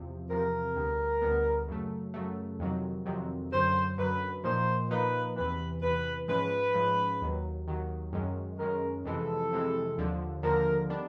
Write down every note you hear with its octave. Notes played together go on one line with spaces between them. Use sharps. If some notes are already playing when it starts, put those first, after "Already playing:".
Already playing: E2 C3 F3
E2 C3 F3 A#4
D2 D3 G3 B3
D2 D3 G3 B3
F#2 C#3 F#3 A3
F#2 C#3 F#3 A3
F2 C3 D#3 F#3
F2 C3 D#3 F#3
F#2 D3 F#3 C5
F#2 D3 F#3 B4
A#2 F3 A#3 D#4 C5
A#2 F3 A#3 D#4 B4
E2 C3 E3 B4
E2 C3 E3 B4
G#2 F3 G#3 C#4 B4
G#2 F3 G#3 C#4
D#2 D#3 F#3
D#2 D#3 F#3
F#2 D#3 G#3 C#4
F#2 D#3 G#3 C#4 A#4
F2 C3 E3 G#3 A4
F2 C3 E3 G#3
D#2 D3 F3
D#2 D3 F3 A#4
D#3 G3 B3 D4